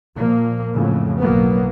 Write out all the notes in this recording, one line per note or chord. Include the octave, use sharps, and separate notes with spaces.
A#2 F3 A#3
F2 A2 C#3 F#3
B1 D3 F#3 A#3 B3